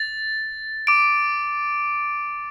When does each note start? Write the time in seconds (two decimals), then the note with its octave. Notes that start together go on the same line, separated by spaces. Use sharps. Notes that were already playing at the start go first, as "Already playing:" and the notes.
Already playing: A6
0.87 D6 D7